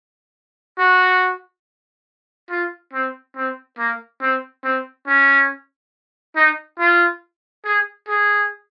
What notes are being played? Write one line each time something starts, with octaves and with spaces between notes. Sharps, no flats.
F#4
F4
C4
C4
A#3
C4
C4
C#4
D#4
F4
G#4
G#4